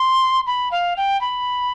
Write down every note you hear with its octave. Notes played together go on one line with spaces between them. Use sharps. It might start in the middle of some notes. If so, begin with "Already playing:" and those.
Already playing: C6
B5
F5
G5
B5